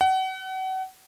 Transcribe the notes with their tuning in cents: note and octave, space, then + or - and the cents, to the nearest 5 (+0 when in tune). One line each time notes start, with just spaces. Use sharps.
F#5 +35